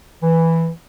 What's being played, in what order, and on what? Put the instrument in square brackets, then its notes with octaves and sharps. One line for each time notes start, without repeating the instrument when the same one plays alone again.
[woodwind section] E3